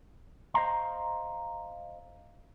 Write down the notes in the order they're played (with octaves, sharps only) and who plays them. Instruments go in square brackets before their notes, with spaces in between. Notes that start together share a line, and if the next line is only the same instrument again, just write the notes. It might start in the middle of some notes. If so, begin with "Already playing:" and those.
[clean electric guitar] C5 D#5 F5 A#5 C6